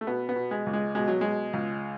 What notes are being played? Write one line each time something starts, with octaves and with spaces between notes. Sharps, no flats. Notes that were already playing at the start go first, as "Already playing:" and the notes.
A3
B2 B3
B3
B2
G#3
C#2
G#3
B2 G#3
F#3
B2 G#3
C#2